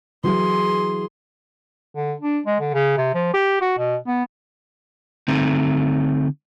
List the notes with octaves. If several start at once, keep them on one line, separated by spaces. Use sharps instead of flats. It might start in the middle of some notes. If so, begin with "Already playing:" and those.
E3 F#3 E4 G#4 C6
D3
D4
G#3
D3
C#3
C3
F3
G4
F#4
B2
B3
D3 A3 C4 D#4